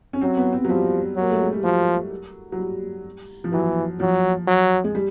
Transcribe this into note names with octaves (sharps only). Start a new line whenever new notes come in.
C#4
F#3 C4
B3
C4
F#3
F3 G3
F#3
A#3
A3
G#3
G3
F3 F#3
F#3
G3
F3
E3 F#3
F3 F#3
F#3
G#3
G3